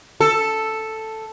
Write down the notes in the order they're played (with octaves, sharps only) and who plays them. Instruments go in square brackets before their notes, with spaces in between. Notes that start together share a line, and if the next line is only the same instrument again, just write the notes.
[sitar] A4